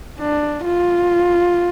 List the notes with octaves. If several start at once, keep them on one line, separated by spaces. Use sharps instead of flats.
D4
F4